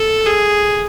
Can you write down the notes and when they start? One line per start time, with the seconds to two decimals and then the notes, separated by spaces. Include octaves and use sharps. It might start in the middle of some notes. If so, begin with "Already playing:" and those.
Already playing: A4
0.26 G#4